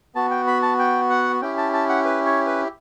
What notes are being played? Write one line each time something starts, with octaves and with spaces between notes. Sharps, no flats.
B3 F#4 A5
G5
B5
A5
G5
F#5
C#4 E4 G4 G5
A5
A5
F#5
B4
C#5
B4